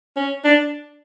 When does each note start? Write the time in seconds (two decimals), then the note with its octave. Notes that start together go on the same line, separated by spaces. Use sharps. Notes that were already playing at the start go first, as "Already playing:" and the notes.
0.16 C#4
0.45 D4